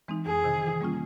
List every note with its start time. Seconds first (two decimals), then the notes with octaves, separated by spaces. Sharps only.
0.08 E3 G#3 C4 D#4
0.26 F2 G#4
0.44 C3 D#3
0.62 E3
0.81 G3 A#3 C#4 F4